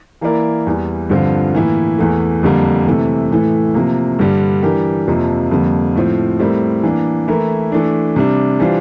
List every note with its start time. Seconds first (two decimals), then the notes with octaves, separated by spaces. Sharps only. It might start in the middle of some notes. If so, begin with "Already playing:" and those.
0.21 E3 A#3 E4 A#4 D5
0.67 E2 E3 G3
1.10 G2 D3 F3 C4 F4
1.54 A2 E3 A#3 E4
1.98 E2 E3 A3
2.43 F2 D3 G3 A#3
2.87 C3 E3 A3
3.30 A2 E3 A3
3.74 C3 F3 A#3
4.19 G2 D3 G3
4.63 E3 G3 D4 G4 A#4
5.07 F2 C3 F3 A#3
5.51 F2 D3 G3 A#3
5.96 A2 F3 C4
6.39 A2 G3 C4 E4 A#4
6.83 E3 A#3 D4
7.28 E3 A3 E4 A#4
7.72 E3 A3 D4
8.16 C3 G3 D4
8.60 E3 G3 D4 F4 C5